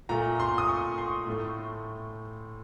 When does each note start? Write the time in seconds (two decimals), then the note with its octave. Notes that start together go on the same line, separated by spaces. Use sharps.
0.09 A#2 A3 A#5
0.40 C6
0.58 D#6
0.69 C#6
0.98 C6
1.27 A2 A3